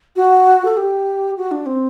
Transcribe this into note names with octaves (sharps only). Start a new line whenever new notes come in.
F#4
A4
G4
F#4
D4
C4